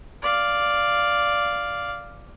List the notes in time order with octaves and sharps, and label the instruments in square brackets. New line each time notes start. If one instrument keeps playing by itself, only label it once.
[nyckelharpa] D5 F5